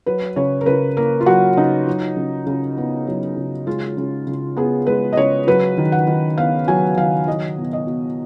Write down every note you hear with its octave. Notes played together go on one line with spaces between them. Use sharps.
F#3 B4
C#3 C#5
A#4
C#3 B4
A#3 A#4
F4
F#3 F#4
C#3 D#4
F#3
C#3
C#3
B3
F#3
C#3
G#3 F4
C#3
C#3
B3 G#4
G#3 B4
D#5
C#3 C#5
F#3 B4
D#3
F#5
D#3
B3 F5
F#3 G#5
D#3 F5
F#3 D#5
B2
D#5
B2